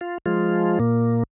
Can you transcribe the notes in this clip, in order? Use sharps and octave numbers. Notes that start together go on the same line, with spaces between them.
F4
F3 G#3 F4
A#2 A#3